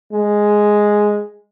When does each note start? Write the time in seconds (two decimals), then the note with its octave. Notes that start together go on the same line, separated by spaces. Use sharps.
0.12 G#3